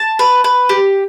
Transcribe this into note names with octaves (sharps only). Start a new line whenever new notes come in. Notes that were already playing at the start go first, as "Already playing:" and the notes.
Already playing: A5
B4
B4
G4